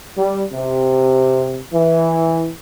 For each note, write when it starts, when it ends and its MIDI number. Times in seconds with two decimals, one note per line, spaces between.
0.17 0.44 55
0.53 1.62 48
1.74 2.50 52